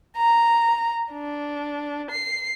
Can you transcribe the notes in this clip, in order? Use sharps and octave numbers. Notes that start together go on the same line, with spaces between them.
A#5
D4
C7